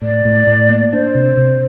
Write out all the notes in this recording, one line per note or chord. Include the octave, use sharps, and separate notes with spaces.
A2 D5
A2
A2
A#3
D4 C5
C3
C3